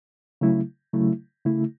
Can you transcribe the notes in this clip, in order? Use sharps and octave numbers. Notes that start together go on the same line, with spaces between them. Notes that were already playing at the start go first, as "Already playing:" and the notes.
C#3 F#3 A3 E4
C#3 F#3 A3 E4
C#3 A3 E4